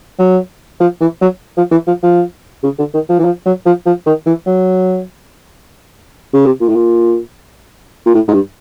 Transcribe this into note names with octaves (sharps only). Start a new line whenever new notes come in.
F#3
F3
E3
F#3
F3
E3
F3
F3
C#3
D3
D#3
F3
E3
F3
F#3
F3
F3
D#3
E3
F#3
C#3
C3
A#2
A2
A#2
A#2
A2
G#2
G2